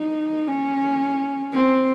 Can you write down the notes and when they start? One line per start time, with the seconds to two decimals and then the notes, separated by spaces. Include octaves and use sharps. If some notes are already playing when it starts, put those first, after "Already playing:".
Already playing: D#4
0.48 C#4
1.54 C4